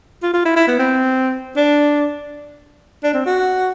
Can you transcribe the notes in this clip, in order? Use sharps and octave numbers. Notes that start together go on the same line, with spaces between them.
F4
F4
E4
E4
B3
C4
D4
D4
C4
F#4